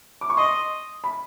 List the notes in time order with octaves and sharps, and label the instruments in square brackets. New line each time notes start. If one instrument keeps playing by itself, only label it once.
[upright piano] D6
C#6
[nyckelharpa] D#5 [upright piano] C6
[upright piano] B5